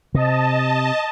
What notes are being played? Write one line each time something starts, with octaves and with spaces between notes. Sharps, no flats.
C3 D#5 A5